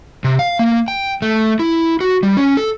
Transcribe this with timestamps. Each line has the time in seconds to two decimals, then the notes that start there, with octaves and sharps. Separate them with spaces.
0.24 C3
0.39 F5
0.59 A#3
0.88 G5
1.22 A3
1.59 E4
2.01 F#4
2.23 G3
2.37 C#4
2.57 A4